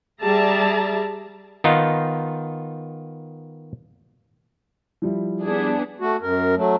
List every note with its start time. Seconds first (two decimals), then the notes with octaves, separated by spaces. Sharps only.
0.23 G3 G#4 D5 E5 A5 A#5
1.64 D#3 B3 D#4 F4
5.02 F3 G3 E4
5.43 B3 D4 G#4
6.00 A3 F#4
6.21 F#2 A#4
6.56 F#3 A3